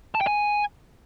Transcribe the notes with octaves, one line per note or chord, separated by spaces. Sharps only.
A5
G5
G#5